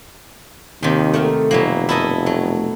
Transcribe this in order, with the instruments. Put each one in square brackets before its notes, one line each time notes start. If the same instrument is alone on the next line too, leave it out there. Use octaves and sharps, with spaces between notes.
[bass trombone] D#2 [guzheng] C3 D#3
[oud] A3 F#4 A#4
[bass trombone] F1 [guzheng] B2 F#3 A#3
[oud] F#2 A#3 [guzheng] E4 A4 D#5
[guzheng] F#3 [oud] A3